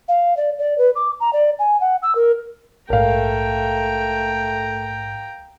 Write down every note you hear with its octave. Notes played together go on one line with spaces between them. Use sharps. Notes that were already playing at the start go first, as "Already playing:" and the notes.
F5
D5
D5
B4
D6
A#5
D5
G#5
F#5
E6
A#4
A#1 G#2 A3 A#4 F5 G5 A#5